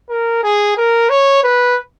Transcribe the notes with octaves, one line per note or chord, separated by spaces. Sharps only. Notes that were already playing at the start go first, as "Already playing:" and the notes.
A#4
G#4
A#4
C#5
B4